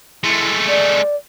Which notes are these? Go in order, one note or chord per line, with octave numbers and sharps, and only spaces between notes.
G#3 A3 E4
D5